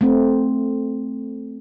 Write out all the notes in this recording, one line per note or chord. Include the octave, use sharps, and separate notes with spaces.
A3 C4